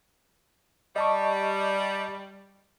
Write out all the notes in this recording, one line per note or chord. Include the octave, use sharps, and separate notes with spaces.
G3 D#5 A5 C#6